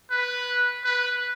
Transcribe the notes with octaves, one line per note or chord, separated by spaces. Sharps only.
B4
B4